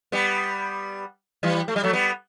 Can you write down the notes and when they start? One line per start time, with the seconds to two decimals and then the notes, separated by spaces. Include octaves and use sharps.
0.12 G3 B3
1.43 E3 G3
1.68 A3
1.76 G3
1.83 F#3 A3
1.93 G3 B3